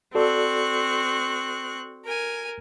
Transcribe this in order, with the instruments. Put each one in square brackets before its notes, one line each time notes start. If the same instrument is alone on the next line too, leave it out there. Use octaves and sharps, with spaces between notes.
[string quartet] C4 C#6 F#6 [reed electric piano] F#4 A4 D5
[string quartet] A#4 G#5